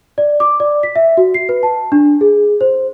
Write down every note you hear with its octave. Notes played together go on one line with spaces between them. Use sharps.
D5
D6
D5
B6
E5
F#4
C7
B4
A5
D4
G#4
C5